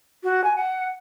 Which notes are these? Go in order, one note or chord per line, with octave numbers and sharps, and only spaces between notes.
F#4
G#5
F#5